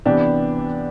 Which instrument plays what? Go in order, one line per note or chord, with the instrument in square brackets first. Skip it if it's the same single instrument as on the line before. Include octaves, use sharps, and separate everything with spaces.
[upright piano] C3 E3 B3 D4 G4